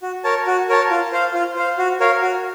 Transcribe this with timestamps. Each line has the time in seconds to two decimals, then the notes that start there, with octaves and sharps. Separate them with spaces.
0.02 F#4
0.24 A#4 C#5 A5
0.47 F#4
0.69 A#4 C#5 A5
0.90 F4
1.12 C5 F5
1.34 F4
1.56 C5 F5
1.78 F#4
2.00 A#4 C#5 F5
2.22 F#4